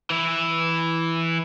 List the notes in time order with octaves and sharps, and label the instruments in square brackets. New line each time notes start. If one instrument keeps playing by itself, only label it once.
[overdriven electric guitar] E3 E4